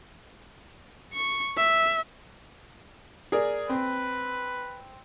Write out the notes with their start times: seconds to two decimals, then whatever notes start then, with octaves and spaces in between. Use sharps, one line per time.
1.13 C#6
1.57 E5
3.32 G#4 A#4 D5
3.69 C4 B4